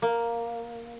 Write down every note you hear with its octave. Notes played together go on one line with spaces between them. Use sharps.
A#3